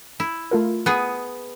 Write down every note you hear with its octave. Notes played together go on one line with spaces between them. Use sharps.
E4
A3 F4 A#4
B3 G#4